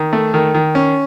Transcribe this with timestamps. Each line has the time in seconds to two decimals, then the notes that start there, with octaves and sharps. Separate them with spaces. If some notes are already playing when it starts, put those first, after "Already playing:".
Already playing: D#3
0.13 A3
0.34 D#3
0.54 D#3
0.75 C#4